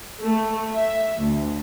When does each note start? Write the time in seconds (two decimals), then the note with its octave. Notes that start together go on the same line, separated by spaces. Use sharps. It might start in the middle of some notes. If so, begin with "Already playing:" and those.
0.21 A3
0.74 E5
1.16 D2